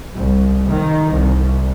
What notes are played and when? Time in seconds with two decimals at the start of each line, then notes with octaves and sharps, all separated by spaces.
0.16 C2
0.67 D#3
1.12 C2